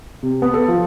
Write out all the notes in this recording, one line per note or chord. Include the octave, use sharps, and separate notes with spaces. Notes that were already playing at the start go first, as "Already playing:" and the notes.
C3
B3
A4
F3